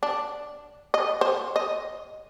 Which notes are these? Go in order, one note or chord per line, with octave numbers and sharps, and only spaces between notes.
D4
D#5
C5
D#5